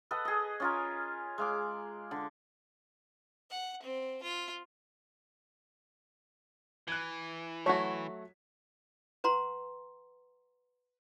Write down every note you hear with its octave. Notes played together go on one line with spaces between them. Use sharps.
A4 B4 D#5 F#5
G#4 D#5
C#4 F4 A#4
G#3 F5 D6
D3
F#5
C4
F4
E3 F#6 G#6
F#3 A3 F#4 C#5 F#5 C#6 B6
B4 F#5 A#5 C6